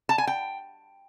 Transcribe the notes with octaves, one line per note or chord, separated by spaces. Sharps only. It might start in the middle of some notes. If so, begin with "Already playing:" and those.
A5
G#5
G5